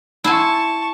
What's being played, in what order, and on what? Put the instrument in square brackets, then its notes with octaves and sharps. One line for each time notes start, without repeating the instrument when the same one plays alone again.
[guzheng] E4 C5 G#5 [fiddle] A5 C#6